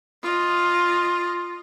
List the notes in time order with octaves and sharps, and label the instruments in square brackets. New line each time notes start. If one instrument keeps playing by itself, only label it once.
[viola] F4 D#5